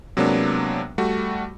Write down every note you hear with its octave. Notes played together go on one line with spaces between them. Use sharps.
C3 F#3 G#3 A#3 B3 D4
G3 A3 F#4